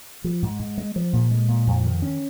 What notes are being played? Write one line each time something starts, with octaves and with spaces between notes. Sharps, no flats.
F3
G#2
G#2
G#3
F3
A#2
G#3
A#2
F2
D#3
C#4